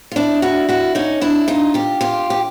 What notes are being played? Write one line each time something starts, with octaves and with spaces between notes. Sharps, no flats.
F4
D4 E4
E4 F#4
E4 F#4
C#4 D#4
D4 E4
D#4 F4
F4 G4
F4 G4
G4